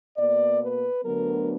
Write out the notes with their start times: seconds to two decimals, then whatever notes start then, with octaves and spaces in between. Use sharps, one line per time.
0.17 B2 A#3 D5
0.61 B4
1.04 D2 D3 F#3 B3 A#4